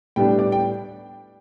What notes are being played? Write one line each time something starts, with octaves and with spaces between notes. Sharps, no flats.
A2 G3 B3 D4 G5
D5
G5